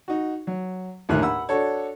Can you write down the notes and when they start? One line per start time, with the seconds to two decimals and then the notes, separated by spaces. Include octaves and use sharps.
0.08 D#4 F#4
0.47 F#3
1.09 A#1 D#2 A2 D3 F#6
1.22 F#5 B5 E6
1.49 D4 F#4 A4 C#5